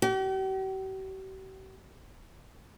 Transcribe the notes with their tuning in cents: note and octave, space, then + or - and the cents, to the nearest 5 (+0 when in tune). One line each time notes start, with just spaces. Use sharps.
G4 -45